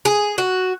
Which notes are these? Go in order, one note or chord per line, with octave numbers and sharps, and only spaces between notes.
G#4
F#4